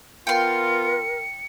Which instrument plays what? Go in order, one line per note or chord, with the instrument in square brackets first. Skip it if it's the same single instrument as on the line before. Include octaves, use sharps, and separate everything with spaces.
[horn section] B3 F4 [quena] A#4 [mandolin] G5 C6 [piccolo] C#7